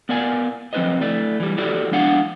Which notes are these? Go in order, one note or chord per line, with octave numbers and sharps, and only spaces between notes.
B3 A#4 D5 F5 G#5
F3 C4 F4 B4 C5 D#5
A3 E4 D5
E3 G3
E4 F#4 G4 A4 D5
F3 G#3 D4 F5 F#5